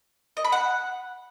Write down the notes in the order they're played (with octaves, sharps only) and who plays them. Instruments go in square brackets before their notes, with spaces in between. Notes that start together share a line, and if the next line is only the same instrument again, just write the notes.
[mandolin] D#5
B5
F#5